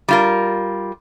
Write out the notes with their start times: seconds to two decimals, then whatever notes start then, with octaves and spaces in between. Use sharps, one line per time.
0.08 G3 F4 A#4